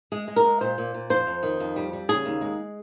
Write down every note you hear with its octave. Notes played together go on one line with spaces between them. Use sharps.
G#3 G#4
G#3
A#4
G#3
A#2 C5
A#2
A#2
F2 C5
F2
D#3
F2
G3
G3
C#3 G#4
D#2
G#3